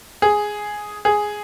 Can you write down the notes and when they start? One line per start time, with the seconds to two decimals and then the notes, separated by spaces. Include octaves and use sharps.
0.22 G#4
1.05 G#4